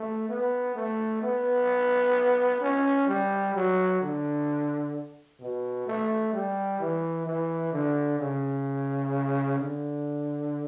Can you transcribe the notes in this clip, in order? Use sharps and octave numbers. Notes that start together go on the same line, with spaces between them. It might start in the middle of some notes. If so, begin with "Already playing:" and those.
Already playing: A3
B3
A3
B3
C#4
G3
F#3
D3
B2
A3
G3
E3
E3
D3
C#3
D3